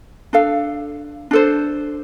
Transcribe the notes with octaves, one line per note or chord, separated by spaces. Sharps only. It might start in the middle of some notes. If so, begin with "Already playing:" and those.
D4 A4 F5
D4 A4 C5